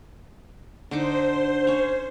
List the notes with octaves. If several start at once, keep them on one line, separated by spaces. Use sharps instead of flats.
D3 D#4 C5 D6
C#4 C#5